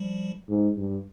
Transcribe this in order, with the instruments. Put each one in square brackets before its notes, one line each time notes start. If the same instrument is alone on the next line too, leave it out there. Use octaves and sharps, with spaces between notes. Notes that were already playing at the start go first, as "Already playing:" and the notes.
Already playing: [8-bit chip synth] F3 G3
[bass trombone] G#2
G2